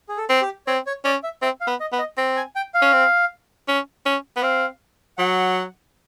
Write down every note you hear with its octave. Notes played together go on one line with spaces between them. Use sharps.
G#4
A4
C4
G4
C4 C#5
C#5
C#4 D5
E5
C4 E5
F5
B3
D#5
B3
D#5
C4
G#5
G5
F5
C#4
C4
C#4
C#4
B3
C4 F5
F#3 F#5